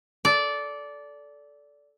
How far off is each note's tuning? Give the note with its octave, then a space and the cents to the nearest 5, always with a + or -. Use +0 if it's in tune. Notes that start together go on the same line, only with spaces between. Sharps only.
A4 -10 D5 -15